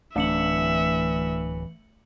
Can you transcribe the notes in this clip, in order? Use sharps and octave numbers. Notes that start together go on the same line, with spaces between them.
D1 E3 A3 D4 E5 C#7 F#7